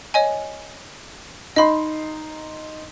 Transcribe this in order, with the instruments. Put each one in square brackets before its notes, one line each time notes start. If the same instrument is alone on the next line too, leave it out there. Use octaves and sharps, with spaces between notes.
[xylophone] C#5 D#5 G#5
[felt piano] D#4 C6 [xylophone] D#5 B5